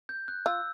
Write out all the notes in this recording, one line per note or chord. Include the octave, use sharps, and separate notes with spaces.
G6
F#6
F4 E6